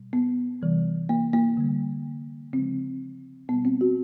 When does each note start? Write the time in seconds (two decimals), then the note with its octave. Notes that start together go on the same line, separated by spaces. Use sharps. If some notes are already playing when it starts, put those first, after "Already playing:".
Already playing: B2 G3
0.13 B3
0.62 C3 E3 G3
1.09 A#3
1.33 A#3
1.57 D3 G3
2.53 C#3 F3 G#3 C4
3.48 B2 G3 B3
3.65 C4
3.81 F#4